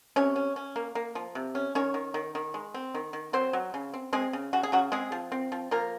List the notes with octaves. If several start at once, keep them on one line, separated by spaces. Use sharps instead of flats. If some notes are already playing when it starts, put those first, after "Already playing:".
C3 C#4 C#5
C#4
C#4
A#3
A#3
F3
C3
C#4
D#3 C#4 C#5
D#3
D#3
D#3
G#3
C4
D#3
D#3
F#3 C4 C5
F#3
C#3
C4
G#3 C4 G#4
C#3
C#3 F#4
G#4
C#3 F#3 F#4
G#3 C4 G#4
F3
C4
F3
F3 A#3 A#4